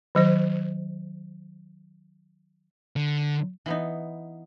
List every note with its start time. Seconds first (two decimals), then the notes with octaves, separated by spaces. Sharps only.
0.15 D#3 F#3 C5
2.96 D3
3.66 E3 B3 D#4